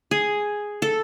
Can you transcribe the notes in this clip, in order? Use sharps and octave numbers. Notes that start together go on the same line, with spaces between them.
G#4
A4